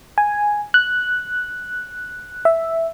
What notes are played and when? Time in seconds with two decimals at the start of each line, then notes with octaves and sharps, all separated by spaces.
0.18 G#5
0.74 F#6
2.45 E5